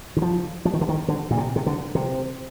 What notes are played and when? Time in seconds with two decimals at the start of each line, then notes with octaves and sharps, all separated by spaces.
0.17 D#3
0.22 F3
0.65 F3
0.73 D#3
0.81 D3
0.89 D#3
1.08 D3
1.31 A#2
1.37 C3
1.56 C3
1.66 D3
1.95 C3